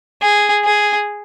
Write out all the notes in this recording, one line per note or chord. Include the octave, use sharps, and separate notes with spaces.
G#4
G#4